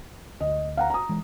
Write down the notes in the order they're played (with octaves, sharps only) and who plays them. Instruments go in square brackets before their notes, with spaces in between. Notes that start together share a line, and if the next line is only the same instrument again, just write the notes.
[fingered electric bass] D2 [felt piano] D#5
[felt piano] F5 F#5 A#5
A#5 D#6
[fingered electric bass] E3 G#3